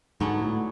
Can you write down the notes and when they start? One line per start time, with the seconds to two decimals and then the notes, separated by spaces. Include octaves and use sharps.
0.20 G#2 D3 F#3 B3
0.42 A2